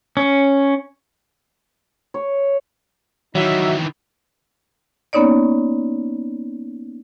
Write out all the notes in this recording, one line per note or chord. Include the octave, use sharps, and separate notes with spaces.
C#4
C#5
D#3 E3 F#3 D#4 E5
A#3 B3 C#4 D#4 C#5 D5